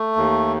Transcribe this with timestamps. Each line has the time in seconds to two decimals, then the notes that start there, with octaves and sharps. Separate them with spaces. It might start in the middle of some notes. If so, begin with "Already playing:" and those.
Already playing: A3
0.16 D#2